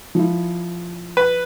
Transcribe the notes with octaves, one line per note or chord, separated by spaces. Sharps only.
F3 E4
B4